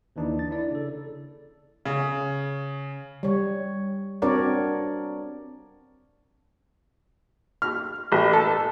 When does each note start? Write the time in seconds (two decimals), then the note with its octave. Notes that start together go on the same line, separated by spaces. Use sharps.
0.16 D#2 E3 D4 D#4
0.37 G1 A6
0.51 D4 E4 D5
0.71 C#3 A4
1.85 C#3
3.23 G3 C#5
4.22 C4 D4 F#4 A#4 C#5 D5
7.62 F6
8.12 A1
8.33 A4